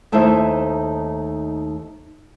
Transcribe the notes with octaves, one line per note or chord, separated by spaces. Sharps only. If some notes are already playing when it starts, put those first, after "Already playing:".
D#2 A3 D#4 E4 C5 E5